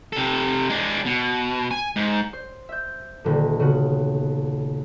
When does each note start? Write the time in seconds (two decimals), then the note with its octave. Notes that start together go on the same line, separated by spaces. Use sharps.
0.13 C3 A4
0.69 G#3 D4
1.06 B2
1.71 G#5
1.96 G#2
2.33 C5
2.69 E5 G6
3.24 D#1 D3
3.60 C#3 B3 F#4